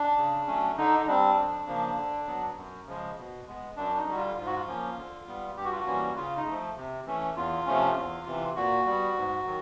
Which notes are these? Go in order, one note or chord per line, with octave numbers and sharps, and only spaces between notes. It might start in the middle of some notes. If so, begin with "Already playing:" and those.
Already playing: D4
C#3
F#3 A3 C#4
D3 D#4
D#4
G3 C4 D4
F2
C#3 F3 A#3
D3
F#3 B3
F#2
C#3 F3 G#3
B2
G#3 B3
F#2 D4
D#4
D3 G3 F#4
F4
G#2 F4
F#4
F4
F3 A#3 C#4
D3
G3 B3
G2 G4
F#4
F4
F#4
E3 G3 A#3 C#4
C#3 F4
D#4
F3 A3
C3
E3 A3 C#4
E2 F4
C3 F3 A3 C#4
E2
C3 E3
A#2 F#4
G3 B3
G#2
D#3 F#3